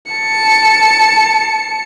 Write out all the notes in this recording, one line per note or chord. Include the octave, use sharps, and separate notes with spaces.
A5 C#7